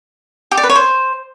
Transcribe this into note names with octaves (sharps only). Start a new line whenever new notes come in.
G4
D5
B4
C#5
C5